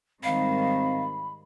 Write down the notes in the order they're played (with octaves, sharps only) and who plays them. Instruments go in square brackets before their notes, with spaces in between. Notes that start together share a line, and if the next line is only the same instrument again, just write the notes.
[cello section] G#2 D#3 G3 [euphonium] C4 [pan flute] F5 [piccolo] B5